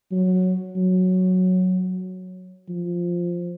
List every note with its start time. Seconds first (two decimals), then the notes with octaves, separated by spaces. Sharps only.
0.12 F#3
0.76 F#3
2.69 F3